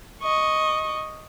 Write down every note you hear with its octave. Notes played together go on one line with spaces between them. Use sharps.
D#5 C#6